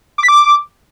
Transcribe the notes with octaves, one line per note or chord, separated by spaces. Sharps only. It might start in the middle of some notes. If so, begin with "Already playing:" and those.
D6
B6
D6